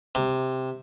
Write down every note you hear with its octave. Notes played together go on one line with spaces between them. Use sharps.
C3